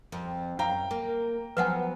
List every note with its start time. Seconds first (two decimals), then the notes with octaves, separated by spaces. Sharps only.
0.12 F2
0.59 F#2 F5 G5 A#5
0.91 A#3
1.57 F3 F#3 B3 B4 F#5 G#5